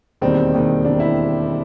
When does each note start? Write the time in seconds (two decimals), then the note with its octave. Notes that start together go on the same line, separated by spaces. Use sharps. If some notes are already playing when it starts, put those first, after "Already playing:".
0.21 E1 D#2 D#3 G3 C4
0.52 E1 D#2 D#3 G3
0.84 E1 D#2 D#3 G3 D4
1.00 E4